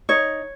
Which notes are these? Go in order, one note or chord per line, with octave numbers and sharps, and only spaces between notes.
D#4 C#5